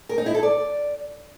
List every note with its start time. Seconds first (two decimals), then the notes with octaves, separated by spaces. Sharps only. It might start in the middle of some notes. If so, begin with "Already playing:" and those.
0.09 A#4
0.18 D#4
0.26 E4
0.34 A4
0.43 D5